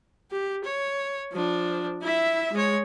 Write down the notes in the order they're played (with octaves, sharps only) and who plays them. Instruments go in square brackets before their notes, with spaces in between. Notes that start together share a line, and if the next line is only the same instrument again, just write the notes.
[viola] G4
C#5
F3 D4
E4 E5
G#3 C#5